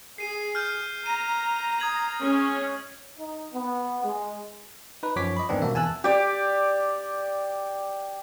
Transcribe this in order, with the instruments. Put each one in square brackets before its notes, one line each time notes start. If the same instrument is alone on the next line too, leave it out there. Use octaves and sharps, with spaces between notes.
[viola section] G#4 [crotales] C7 D#7
[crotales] F6 G6
[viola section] A#5 [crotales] D#7
[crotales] D#6 G#6 F#7
[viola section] G#3 C#4
[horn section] D#4
B3
G#3
[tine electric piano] D#4 B4
F#2 F3 C#5 D6 B6
D#5 B5
E2 G#2 D#3 B3 C4 D4
B2 G3 A#3 E5
E2 G#5 A5 E6 F#6
[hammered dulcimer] G4 D5